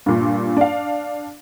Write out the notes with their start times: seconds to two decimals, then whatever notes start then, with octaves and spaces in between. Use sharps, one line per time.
0.06 G2 A#2
0.57 D4 F5